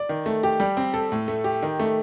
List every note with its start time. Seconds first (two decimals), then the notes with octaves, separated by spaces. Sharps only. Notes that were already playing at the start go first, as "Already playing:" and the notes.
Already playing: D5
0.09 D#3
0.26 A3
0.43 G4
0.60 G3
0.77 C4
0.94 A4
1.12 A2
1.28 A3
1.44 G4
1.63 D#3
1.79 A3